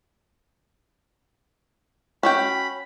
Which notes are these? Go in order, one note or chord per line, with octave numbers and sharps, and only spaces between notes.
C#4 F#4 G5 B5